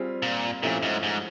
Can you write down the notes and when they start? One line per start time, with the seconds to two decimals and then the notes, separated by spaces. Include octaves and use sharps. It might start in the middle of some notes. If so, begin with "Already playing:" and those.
Already playing: G3 C4 F4 G#4
0.22 A#2
0.62 A#2 F3 A3 C#4 E4 G4
0.82 G#2
1.03 G#2